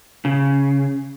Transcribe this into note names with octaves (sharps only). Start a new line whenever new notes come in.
C#3